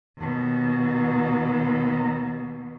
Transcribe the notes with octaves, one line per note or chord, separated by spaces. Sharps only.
D#2 B2